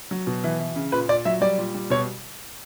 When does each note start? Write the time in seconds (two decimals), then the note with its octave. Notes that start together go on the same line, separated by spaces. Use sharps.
0.11 F#3
0.27 B2
0.44 E3
0.60 E3
0.76 C#3
0.92 A#2 B4
1.08 A#2 D5
1.25 F#3 E5
1.41 G3 D5
1.58 A#2
1.75 G3
1.90 B2 C#5